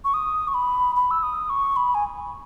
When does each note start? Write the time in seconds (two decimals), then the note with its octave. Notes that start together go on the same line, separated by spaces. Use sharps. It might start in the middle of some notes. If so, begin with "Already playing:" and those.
0.05 C#6
0.14 D#6
0.48 C#6
0.54 B5
0.96 B5
1.11 E6
1.23 D#6
1.50 C#6
1.76 B5
1.95 G#5